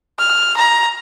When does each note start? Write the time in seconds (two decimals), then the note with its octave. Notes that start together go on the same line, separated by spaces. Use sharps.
0.19 F6
0.57 A#5